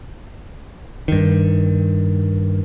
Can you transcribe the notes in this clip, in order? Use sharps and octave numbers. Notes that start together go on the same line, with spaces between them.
G2 D#3